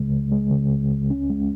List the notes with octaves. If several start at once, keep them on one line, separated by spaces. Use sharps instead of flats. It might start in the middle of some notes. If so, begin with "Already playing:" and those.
Already playing: C#2 C#3 G#3
C#2
G#3
C#3
C#2
C#2
C#4
G#3